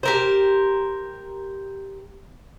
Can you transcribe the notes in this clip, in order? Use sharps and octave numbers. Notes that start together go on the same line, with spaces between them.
G4 A#4 C5